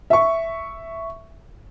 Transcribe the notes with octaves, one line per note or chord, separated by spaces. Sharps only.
E5 C#6